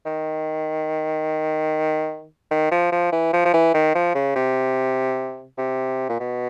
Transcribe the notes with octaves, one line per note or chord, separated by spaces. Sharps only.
D#3
D#3
F3
F3
E3
F3
F3
E3
D#3
F3
C#3
C3
C3
A#2
B2